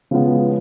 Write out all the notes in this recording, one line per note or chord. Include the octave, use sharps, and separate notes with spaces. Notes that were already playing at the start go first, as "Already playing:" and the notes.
C#3 F3 G#3 B3